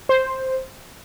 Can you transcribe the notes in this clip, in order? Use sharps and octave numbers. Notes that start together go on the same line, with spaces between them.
C5